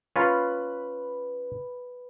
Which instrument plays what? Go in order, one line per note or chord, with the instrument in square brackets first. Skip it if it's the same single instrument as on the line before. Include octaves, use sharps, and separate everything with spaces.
[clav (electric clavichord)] C#4 F4 F5 [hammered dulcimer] B4 B5